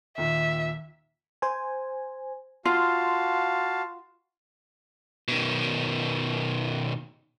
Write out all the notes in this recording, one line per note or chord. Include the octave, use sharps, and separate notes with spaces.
D#2 A#2 D#3 E5
C5 G#5
F4 F#4 F5 A5 C6
B2 D#3